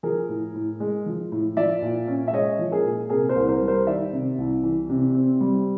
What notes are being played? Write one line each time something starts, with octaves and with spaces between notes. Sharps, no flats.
F3 G#4 A#4
A2
A2
G#3
F3
A2
F3 D5 E5
A#2
C#4
E5
G#3 C#5 D#5
F3
G#4 A#4
A#2
C3 G#4 A#4
A#4 C5
C2
A#4 C5
G3
A#4 C5
D#3 D5 E5
C3
C2
E3
C3
C4
G3